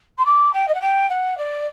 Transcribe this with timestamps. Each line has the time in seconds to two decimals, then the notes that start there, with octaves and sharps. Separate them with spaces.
0.18 C6
0.25 D6
0.53 G5
0.68 D#5
0.74 F#5
0.81 G5
1.09 F#5
1.37 D5